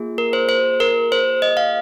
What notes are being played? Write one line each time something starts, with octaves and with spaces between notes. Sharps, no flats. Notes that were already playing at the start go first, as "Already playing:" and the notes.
Already playing: A#3 F4 G#4
A#4
C5
C5
A#4
C5
D#5
F5